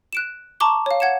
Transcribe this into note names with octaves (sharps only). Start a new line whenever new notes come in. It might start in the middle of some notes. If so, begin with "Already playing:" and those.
F#6 D7 E7
A5 A#5 C#6 D6 G7
C#5 F5
F#5 G#6 C#7 E7